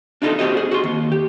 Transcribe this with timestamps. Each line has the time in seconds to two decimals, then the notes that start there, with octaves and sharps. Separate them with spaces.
0.22 D4 D#4 F4 F#4 A4 D#5
0.39 C4 F#4 G4 D#5
0.57 G#4
0.71 F#4 C6
0.84 D#2
1.12 G4